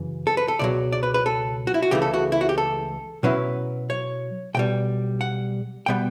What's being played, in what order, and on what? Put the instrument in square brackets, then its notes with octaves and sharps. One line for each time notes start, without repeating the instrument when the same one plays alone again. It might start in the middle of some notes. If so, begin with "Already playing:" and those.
Already playing: [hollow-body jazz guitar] F#2 C#3 E3
A4
B4
A4
C#2 B2 F#3 D5
D5
B4
B4
A4
F#4
E4
F#4
C#2 C#3 E3 A3 G4
A4
F#4
E4
F#4
G4
A4
B2 F#3 C#4 E4 B4
C#5
B1 B2 G3 G5
F#5
B2 G3 B3 G5